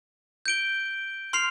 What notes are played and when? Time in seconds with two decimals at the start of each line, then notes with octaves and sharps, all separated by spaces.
0.46 G6 D7 G7
1.33 C6 F6 C7 F7